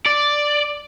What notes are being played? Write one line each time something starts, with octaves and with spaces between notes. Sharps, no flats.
D5